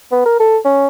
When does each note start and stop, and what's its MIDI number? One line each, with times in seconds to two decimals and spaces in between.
0.12 0.23 59
0.26 0.35 70
0.40 0.58 69
0.65 0.88 61